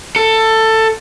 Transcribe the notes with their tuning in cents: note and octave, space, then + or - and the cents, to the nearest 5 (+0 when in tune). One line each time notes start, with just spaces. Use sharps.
A4 +15